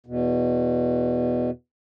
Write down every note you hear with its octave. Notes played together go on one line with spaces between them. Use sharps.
E2 B2